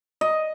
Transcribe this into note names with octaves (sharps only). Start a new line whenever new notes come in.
D#5